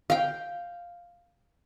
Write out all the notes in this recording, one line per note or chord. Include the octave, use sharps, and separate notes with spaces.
F5 G5